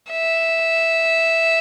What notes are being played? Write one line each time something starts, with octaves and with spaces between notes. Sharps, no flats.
E5